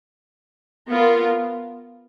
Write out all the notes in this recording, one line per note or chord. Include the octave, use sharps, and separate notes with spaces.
B3 F4 A#4